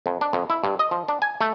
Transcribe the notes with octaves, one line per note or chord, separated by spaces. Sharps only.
F2
D4
F2
E4
G2
D#5
F3
D4
G#5
A3